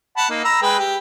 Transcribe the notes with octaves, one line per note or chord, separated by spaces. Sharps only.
F#5 A5 B5
A#3 D#4
A#5 B5 E6
G#3 B4 G5
G4